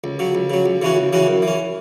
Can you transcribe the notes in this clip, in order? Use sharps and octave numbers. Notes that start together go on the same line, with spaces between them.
C#2
C#3 F#3
C#2
C#3 F#3
C#2
C#3 E3 C#4 F#4
C#2
C#3 E3 C#4 F#4
F#2
E3
C#4